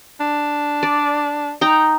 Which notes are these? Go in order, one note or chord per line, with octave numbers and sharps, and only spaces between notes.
D4
D5
D#4 G5 A#5